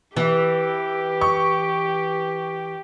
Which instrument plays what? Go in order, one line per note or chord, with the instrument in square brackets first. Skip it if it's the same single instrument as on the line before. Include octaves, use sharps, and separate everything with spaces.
[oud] E3 [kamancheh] G4
[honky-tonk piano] C#6